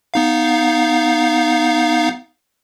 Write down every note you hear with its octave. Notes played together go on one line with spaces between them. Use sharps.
B3 D#4 F5